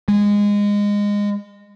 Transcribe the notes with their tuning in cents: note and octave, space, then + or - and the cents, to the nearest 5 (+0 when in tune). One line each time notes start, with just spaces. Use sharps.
G#3 -20